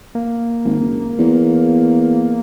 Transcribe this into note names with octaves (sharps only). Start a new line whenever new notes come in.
A#3
G#1
F#1
E2